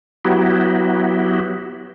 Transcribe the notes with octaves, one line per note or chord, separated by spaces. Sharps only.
F#3 B3 E4 F#4 G4